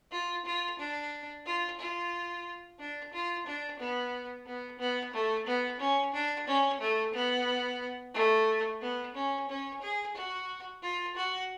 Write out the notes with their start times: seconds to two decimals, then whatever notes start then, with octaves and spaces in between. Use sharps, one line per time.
0.12 F4
0.45 F4
0.79 D4
1.45 F4
1.79 F4
2.79 D4
3.13 F4
3.46 D4
3.79 B3
4.46 B3
4.79 B3
5.13 A3
5.47 B3
5.80 C#4
6.14 D4
6.48 C#4
6.81 A3
7.14 B3
8.14 A3
8.81 B3
9.15 C#4
9.49 C#4
9.82 G#4
10.15 F#4
10.82 F4
11.16 F#4